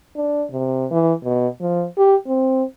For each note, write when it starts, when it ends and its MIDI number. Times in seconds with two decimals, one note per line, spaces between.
0.16 0.45 62
0.51 0.85 48
0.91 1.13 52
1.24 1.48 47
1.61 1.85 53
1.98 2.15 67
2.27 2.63 60